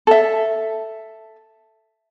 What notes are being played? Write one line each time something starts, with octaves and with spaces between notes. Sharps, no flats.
A4 E5